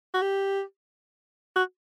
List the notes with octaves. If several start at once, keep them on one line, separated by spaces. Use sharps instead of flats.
F#4
G4
F#4